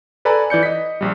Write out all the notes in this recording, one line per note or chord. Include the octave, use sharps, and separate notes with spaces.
A4 B4 D5 G#5 A#5 B5
E3 D5 G6 C#7
D#5 B6
A#1 G3